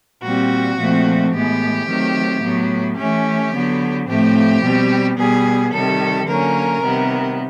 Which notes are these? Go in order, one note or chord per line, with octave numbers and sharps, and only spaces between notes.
A#2 G3 C4 F#4
A#2 F3 A3 C4
A2 E3 G#3 B3 G4
D#3 F#3 A3 C4
A2 F#3 B3
E3 A3 C#4 G4
D3 F#3 B3
A2 F3 A3 C4 G4
B2 G3 C4
B2 G3 B3 G#4
C3 D#3 G3 A4
D3 F#3 A#3 C#4 A#4
C3 D#3 G3 B3